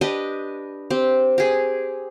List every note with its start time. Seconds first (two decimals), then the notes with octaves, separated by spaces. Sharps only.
0.01 D4 G4 B4 D#5
0.90 C4 G4
1.38 G4 G#4